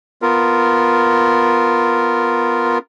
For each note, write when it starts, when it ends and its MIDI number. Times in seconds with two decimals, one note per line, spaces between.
0.22 2.78 59
0.22 2.78 65
0.22 2.78 70